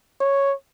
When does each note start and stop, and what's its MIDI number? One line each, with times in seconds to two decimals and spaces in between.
0.21 0.53 73